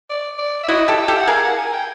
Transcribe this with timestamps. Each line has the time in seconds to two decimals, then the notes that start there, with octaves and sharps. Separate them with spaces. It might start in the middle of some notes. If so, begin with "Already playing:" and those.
0.10 D5
0.38 D5
0.64 E5
0.68 E4 F#4 D#5
0.88 G4 A4
0.98 E5
1.08 G4 A4
1.17 F#5
1.27 G#4 A#4 F5
1.42 F#5
1.58 G#5
1.73 G5